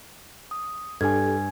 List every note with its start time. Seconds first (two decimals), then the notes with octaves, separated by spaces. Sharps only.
0.51 D#6
1.01 G2 D4 G4 A4 G#5 G#6